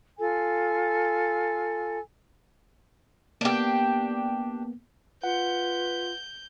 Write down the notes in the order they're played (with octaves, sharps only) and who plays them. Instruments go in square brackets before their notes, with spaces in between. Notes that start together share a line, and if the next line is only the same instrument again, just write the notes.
[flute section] F4 A4 G#5
[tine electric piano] A#3 B3 [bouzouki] D4 G4
[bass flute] F4 [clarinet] B4 [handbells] F#5 [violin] G6